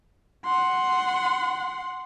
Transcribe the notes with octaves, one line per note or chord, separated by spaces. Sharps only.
F#5 C6